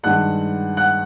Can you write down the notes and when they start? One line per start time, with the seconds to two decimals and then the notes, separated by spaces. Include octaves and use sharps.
0.03 G2 D#3 G#3 F#5 F#6
0.77 F#5 F#6